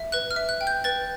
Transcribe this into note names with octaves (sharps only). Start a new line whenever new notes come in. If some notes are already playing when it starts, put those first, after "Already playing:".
Already playing: E5
B4 F#6
F6
E5
F#6
G5
G6
B4 A6